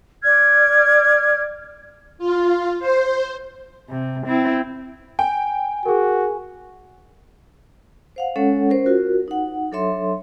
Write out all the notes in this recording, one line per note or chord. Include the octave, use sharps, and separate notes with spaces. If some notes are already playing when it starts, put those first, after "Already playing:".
D5 F6 G#6
F4
C5
C3
C4 E4
G5 G#5
F#4 G#4 A#4
C5 F5 F#5
G#3 C#4 A4 C#5 F#5
C#4 A#4 C5
F4 F#4 A#4
D#4 F#5
F#3 D4 A4 C#5 E5 C6